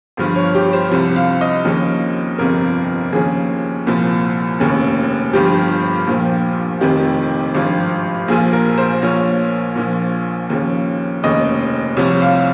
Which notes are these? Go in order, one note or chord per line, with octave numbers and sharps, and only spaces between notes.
G1 G2 F3
C#5
G4
C5
C2 C3 F3
F5
D#5
D#2 C#3 F3
G1 F2 C3 F3 A#4
D#2 C#3 F3 G#4
C2 A#2 F3
F1 D#2 C#3
G1 G2 F3 G4
A#1 A#2 F3
F1 F2 C3 D#3 G4
G#1 G2 F3
A#1 A#2 F3 G#4
A#4
C5
A#1 A#2 F3 C#5
A#1 A#2 F3
D#2 C#3 F3
F1 D#2 C#3 D#5
C2 C3 F3 C#5
F5